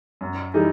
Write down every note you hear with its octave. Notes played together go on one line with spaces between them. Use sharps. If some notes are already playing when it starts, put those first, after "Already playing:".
F#2
E3 G3 D#4